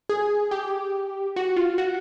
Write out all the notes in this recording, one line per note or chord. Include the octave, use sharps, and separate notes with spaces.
G#4
G4
F#4
F4
F#4